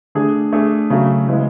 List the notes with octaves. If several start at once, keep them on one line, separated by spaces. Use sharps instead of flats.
D3 A3 D4 G#4
A3 D4 G#4
C#3 F#3 A3
C#3 E3 G#3 B3